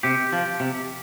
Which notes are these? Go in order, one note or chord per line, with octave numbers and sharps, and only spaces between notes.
C3 G4
F3
C3